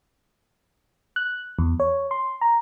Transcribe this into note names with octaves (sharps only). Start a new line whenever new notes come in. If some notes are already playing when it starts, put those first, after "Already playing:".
F#6
E2
C#5
C6
A#5